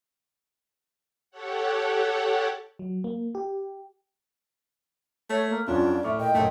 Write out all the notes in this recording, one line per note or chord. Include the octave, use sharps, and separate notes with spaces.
G4 A4 C#5 F#5
F#3
A#3
G4
A3 C#5
A#3
F2 F#3 C#4 D4 F4 D5
A2 E5 C#6 D6 F6
A#2 D#5 G5
F#1 A#2 F#3 A3 D#5